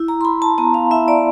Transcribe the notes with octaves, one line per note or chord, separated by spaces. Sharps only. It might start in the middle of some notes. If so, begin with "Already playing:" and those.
Already playing: E4
A#5
C6
E4 B5
A5
B3 A#5
F5
E4 E5
D5